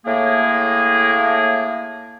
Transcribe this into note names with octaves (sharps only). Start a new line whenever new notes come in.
A2 A#3 G#4